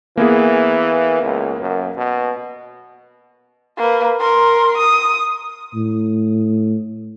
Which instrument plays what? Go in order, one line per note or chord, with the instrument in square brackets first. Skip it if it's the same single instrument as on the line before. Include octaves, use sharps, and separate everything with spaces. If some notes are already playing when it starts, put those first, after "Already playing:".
[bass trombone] E3 [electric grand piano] A#3 B3 G#4
[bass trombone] C#2
F#2
B2
[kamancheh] A#3 B4
A#4 C6
D#6
[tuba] A2